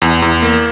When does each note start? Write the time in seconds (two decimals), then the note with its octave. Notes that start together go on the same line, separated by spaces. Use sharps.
0.02 E2
0.22 E2
0.42 A#3